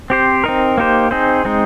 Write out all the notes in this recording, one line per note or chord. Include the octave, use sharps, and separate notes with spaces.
C4 G4 C5
C4 D#4 A#4
A#3 D#4 G4 C5
C4 D#4 G#4 C5
G#3 C4 D#4